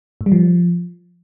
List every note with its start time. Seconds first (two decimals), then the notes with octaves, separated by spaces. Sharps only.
0.21 A2
0.26 G3
0.32 F3